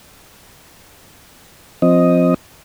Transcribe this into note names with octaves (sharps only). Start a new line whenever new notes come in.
F3 C4 D#5